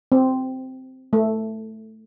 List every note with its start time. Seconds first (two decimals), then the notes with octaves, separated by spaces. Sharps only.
0.12 C4
1.13 A3